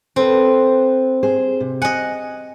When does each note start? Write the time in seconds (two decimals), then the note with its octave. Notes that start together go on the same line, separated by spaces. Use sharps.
0.16 C4 A4 B4
1.23 G#4 C5
1.60 C3
1.82 D#5 F#5 G#5